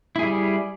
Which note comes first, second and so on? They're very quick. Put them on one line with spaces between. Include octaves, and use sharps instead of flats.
E4 G#4 G3